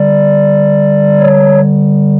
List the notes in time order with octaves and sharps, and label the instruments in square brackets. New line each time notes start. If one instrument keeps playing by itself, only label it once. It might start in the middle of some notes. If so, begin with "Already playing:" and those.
Already playing: [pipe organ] D3 G3 D5
C#5